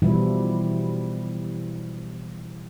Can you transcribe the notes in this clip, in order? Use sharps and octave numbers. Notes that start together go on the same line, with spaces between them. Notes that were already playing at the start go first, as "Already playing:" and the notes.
B2 E3 F3 G3 E4